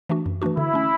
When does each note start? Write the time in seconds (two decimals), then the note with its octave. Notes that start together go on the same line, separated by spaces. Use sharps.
0.09 E3 A3 D4 F#4
0.26 F#2
0.42 E3 A3 D4 F#4
0.57 D3 E4
0.73 A3 C#4